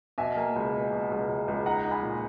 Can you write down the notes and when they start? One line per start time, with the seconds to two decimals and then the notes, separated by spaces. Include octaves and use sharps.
0.18 B2 E5 G#5
0.37 A#3
0.56 C#2
0.74 B2
0.93 B2
1.11 C#2
1.29 C#2
1.48 C#2
1.66 D#4 F#5 A#5
1.85 D#4
1.91 G#5 B5
2.03 A#2